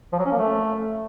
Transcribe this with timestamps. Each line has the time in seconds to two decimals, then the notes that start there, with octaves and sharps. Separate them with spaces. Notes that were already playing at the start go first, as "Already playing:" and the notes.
0.12 F3
0.19 F#3
0.25 C#4
0.32 A#3
0.38 A3